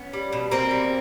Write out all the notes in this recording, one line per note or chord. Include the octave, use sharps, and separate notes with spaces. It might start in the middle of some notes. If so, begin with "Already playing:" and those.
Already playing: B3 C#4
G3
B2
B2 A#3 C4
G3